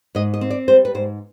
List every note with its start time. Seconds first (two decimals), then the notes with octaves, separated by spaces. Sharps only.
0.15 G#2 D#5
0.34 D#5
0.41 C4
0.50 D5
0.68 G3 C5
0.85 B4
0.95 G#2 C5